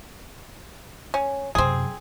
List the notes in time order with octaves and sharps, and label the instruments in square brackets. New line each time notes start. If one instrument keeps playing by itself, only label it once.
[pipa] C#4
[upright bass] F#2 C3 [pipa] C4 G#4